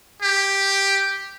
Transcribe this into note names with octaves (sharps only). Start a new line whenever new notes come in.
G4